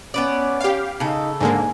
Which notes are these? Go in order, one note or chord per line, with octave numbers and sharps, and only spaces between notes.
B3 C#4 B4 D5
G4 F5
C#3 D#4 A4
G#2 D3 A#3 G#5